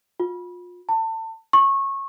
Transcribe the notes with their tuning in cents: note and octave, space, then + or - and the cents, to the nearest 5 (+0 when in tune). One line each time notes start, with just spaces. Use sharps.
F4 +35
A5 +30
C#6 -20